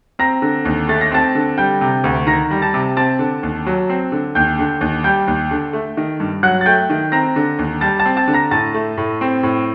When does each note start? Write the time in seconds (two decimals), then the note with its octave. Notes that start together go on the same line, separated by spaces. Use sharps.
0.19 C4 A#5 A#6
0.42 D3
0.65 D#2
0.88 A3 A6
1.01 A#6
1.11 C4 A5 A6
1.35 D3
1.58 G3 G5 G6
1.81 C3
2.04 D2
2.27 D#3 A#5 A#6
2.51 G3
2.62 A5 A6
2.74 C3
2.97 C4 A5 A6
3.19 D3
3.43 D#2
3.66 F#3
3.89 C4
4.12 D3
4.35 D#2 G5 G6
4.59 D3
4.81 D#2
5.04 G3 G5 G6
5.27 D#2
5.51 D3
5.73 A3
5.97 D#3
6.20 G2
6.43 F#3 F#5 F#6
6.61 A6
6.66 A3 G5 G6
6.90 D#3
7.12 C4 A#5 A#6
7.36 D3
7.59 D#2
7.81 G3 A5 A6
7.99 A5 A6
8.06 C4
8.17 A5 A6
8.28 D3
8.34 A#5 A#6
8.51 A2 A5 A6
8.74 A3
8.97 A2
9.21 C4
9.43 A2